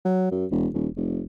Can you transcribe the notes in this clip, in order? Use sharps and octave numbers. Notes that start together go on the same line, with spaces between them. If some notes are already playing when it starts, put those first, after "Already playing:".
F#3
F#2
E1
D#1
F1